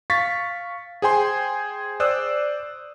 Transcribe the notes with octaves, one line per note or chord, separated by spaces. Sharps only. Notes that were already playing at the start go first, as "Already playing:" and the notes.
F5 C#6 A6 B6
G#4 C5 G5 G#5 C6
C5 D5 D#6 E6 F#6